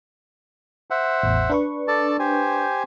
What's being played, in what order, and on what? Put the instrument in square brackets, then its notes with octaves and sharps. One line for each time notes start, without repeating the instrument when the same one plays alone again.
[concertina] C5 E5 F#5
[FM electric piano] A1 E2
D4 B4 C#6
[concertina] A4 D5 A5
G4 C5 G#5